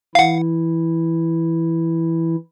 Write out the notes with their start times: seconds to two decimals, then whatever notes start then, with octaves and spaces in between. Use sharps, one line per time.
0.15 E3 E4 F5 F#5